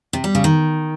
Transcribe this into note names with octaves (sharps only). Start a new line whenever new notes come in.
C3
G3
C#3
D#3